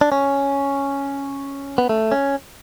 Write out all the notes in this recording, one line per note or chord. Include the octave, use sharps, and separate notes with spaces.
D4
C#4
B3
A3
C#4